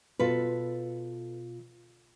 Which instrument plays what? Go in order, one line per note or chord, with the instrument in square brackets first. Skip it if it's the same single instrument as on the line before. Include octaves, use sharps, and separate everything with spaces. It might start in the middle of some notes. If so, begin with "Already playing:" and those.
[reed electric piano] B2 F4 [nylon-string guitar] A4 B4